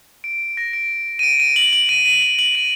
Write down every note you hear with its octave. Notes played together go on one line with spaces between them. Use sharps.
D7
A#6
D7
D#7
D7
D#7
F#7
F#7
D#7
D#7
F#7
F#7
D#7